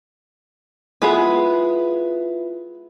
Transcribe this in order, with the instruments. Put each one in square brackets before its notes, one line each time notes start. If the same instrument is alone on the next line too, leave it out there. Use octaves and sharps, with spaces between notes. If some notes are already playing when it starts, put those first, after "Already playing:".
[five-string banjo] G#3 B3 G#4 [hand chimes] E4 F4 E5 [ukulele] B4